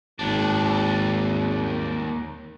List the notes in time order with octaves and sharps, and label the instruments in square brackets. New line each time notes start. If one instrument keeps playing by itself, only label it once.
[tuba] G#1 [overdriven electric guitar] D#2 D4